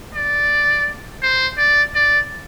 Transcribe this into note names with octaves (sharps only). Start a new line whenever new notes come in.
D5
C5
D5
D5